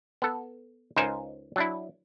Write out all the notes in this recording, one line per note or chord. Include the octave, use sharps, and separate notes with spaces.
B3 A4
C#2 D#4 A#4 C5 G#5
F#3 D4 E4